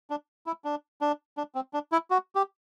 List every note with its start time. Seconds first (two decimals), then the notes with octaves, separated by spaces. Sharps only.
0.10 D4
0.46 E4
0.64 D4
1.01 D4
1.37 D4
1.55 C4
1.73 D4
1.92 E4
2.10 F#4
2.35 G4